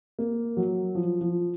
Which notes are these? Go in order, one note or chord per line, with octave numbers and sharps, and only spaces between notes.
A#3
F#3
F3
F3